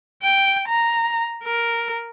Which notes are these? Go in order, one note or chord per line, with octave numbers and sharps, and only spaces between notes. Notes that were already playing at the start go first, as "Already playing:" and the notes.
G5
A#5
A#4